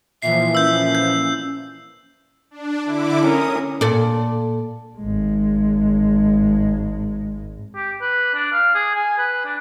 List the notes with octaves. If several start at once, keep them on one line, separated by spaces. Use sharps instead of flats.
A#2 E3 F3 E5 C7
C#4 E6 G6
G6
D4
D3 E4 D6
C#4 A#4 D#6
A#2 A4 D5
G#1 G#3
G4
B4
D4
F5
G#4
G#5
B4
D4